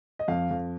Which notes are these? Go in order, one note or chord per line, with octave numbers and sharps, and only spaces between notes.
D#5
F2 F5
F2